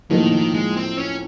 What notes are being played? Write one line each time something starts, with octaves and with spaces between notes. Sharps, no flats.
A2 D#3 F3 A#3 D#4
D#3
G#3
C4
C#4